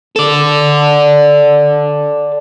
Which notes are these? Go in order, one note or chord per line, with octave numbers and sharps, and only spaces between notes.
A4 D5